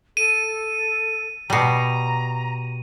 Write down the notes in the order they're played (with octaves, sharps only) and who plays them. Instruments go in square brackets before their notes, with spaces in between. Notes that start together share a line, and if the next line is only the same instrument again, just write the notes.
[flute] A4 [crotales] D#7
[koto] B2 G3 [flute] A#5